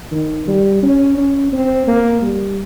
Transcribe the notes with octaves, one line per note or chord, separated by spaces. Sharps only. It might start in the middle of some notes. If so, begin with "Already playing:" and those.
D#3
G3
C#4
C#4
C4
A#3
G3